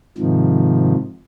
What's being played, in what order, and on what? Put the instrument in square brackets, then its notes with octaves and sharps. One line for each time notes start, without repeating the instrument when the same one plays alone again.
[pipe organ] G#2 C3 D#3 F3